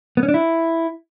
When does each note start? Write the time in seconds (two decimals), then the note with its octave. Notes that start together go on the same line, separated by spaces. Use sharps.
0.17 B3
0.23 C#4
0.28 D4
0.34 E4